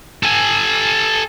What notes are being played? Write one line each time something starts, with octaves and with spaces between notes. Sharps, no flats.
A4 G#5